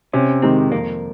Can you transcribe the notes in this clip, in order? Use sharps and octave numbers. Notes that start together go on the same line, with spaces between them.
C3 C#4
D#3 G#3 C4 D#4 G4
F2 A#3